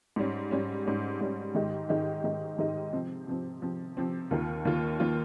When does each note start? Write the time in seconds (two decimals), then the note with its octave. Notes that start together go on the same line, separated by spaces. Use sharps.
0.16 G#2 G3 C#4
0.51 G#2 G3 C#4
0.85 G#2 G3 C#4
1.21 G#2 G3 C#4
1.55 G#2 D#3 G#3 D#4 G4
1.89 G#2 D#3 G#3 D#4 G4
2.24 G#2 D#3 G#3 D#4 G4
2.58 G#2 D#3 G#3 D#4 G4
2.93 C3 F3 C4
3.27 C3 F3 C4
3.62 C3 F3 C4
3.97 C3 F3 C4
4.31 D#2 D#3 A#3 F4
4.65 D#2 D#3 A#3 F4
5.00 D#3 A#3 F4